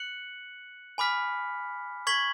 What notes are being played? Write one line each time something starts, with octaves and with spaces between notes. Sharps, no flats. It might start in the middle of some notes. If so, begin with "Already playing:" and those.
Already playing: F#6 C#7 F#7
G#5 B5 D6 F6 B6
C#6 G#6 B6 F#7